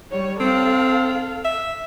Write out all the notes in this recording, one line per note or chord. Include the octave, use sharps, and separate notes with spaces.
G3 C#5
C4 A4 F5
E5